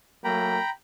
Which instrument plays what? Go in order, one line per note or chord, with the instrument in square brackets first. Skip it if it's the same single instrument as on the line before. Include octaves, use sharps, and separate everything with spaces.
[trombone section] F#3 A3 A#3 [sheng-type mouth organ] G5 A#5 B5